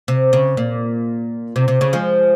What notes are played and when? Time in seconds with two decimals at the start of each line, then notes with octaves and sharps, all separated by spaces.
0.08 C3
0.33 C#3
0.57 A#2
1.56 C3
1.68 C3
1.81 C#3
1.93 F3 G#3